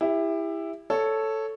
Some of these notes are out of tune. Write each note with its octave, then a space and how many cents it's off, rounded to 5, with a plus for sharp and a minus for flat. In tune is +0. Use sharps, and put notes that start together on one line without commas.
E4 +0 G4 +30
A4 +0 C#5 +0